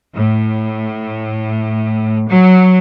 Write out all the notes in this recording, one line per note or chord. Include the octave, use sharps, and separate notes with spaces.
A2
F#3